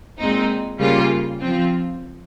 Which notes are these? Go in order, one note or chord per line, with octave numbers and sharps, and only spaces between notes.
A#2 G#3 C4 D#4
C#3 G3 A#3 F4
F3 C4 F4